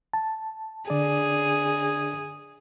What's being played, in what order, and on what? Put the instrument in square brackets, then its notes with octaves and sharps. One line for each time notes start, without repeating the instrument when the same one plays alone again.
[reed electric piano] A5
[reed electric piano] D3 D4 D5 [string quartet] G#4